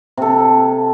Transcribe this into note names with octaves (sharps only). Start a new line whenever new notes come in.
C3 A4